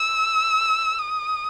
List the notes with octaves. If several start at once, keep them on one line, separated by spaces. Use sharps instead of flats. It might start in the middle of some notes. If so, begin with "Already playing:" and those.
Already playing: E6
D#6